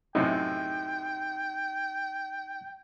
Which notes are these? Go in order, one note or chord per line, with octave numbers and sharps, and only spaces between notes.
F#2 A2 C3 D#4 G5